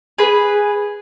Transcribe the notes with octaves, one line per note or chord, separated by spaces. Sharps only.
G#4 B4